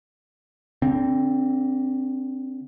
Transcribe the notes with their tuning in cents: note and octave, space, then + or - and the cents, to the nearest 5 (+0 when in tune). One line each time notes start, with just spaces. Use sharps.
D3 -30 C4 +0